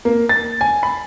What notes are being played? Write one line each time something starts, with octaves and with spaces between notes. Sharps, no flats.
A#3
A6
G#5
B5